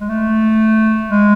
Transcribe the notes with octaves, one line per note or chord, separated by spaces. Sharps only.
G#3
A3
G#3